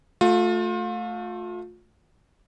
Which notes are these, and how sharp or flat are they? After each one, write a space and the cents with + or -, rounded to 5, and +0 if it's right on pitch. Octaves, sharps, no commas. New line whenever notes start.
A3 +0 F4 +35